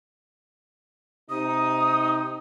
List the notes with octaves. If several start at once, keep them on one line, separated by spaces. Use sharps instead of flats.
C3 D#4 D#6